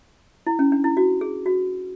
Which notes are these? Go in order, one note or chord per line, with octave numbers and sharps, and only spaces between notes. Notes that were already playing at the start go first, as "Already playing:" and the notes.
E4
C#4
D4
E4
F#4
G#4
F#4